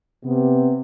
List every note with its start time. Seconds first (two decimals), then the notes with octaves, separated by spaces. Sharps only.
0.24 C3 B3